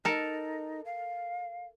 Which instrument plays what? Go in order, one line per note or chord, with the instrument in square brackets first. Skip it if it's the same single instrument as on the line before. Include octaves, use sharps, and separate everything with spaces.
[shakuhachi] D#4 [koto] A4 A#4
[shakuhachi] F5